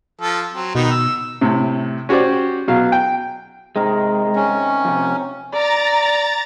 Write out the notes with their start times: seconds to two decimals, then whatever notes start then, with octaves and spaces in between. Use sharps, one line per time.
0.21 F3 A4
0.53 F#3 C4
0.75 B2 D#3 B3 D#4
0.91 E6
1.41 A2 C3
2.09 C#4 F#4 G4 C5 D5
2.68 B2 F#3 F5
2.92 G5
3.76 C3 D#3 G#3 A#4
4.35 C#4
4.85 F2 C3
5.52 D5 A#5 A6